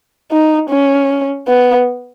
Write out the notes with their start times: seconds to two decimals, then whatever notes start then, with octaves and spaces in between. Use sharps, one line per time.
0.32 D#4
0.70 C#4
1.48 B3